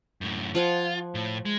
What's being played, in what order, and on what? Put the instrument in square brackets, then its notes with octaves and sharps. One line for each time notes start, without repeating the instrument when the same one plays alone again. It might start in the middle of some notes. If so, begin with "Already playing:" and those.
[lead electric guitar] F#2 A2
[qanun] F3 F#5 G#5 [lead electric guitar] F4
[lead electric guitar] A2
G#3